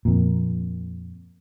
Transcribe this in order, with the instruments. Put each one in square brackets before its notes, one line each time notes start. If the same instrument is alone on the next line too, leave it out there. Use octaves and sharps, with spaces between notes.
[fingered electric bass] F2 A#2